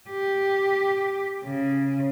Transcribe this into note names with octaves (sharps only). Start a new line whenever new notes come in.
G4
C#3